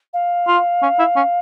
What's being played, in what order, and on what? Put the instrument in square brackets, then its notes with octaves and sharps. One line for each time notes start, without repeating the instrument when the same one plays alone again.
[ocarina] F5
[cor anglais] F4
C#4
E4
C#4